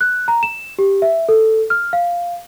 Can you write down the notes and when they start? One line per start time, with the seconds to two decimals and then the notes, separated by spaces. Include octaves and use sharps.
0.01 F#6
0.28 A#5
0.43 E7
0.79 G4
1.02 E5
1.29 A4
1.70 F6
1.93 F5